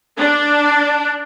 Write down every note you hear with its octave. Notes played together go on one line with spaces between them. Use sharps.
D4